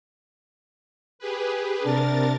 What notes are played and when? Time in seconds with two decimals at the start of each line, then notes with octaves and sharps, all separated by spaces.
1.19 G4 G#4 B4
1.83 C3 D4 A#4 A6